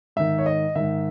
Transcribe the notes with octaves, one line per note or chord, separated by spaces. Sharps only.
G#2 D#3 E5
C#5
D#5
G#2 D#3 E5